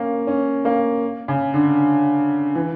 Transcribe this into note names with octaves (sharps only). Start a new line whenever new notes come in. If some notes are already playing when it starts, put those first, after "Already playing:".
Already playing: A#3 C#4
C#4
A#3
C#3
D3
E3